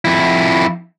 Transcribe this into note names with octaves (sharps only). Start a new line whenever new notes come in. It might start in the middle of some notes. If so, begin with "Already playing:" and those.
F2 E4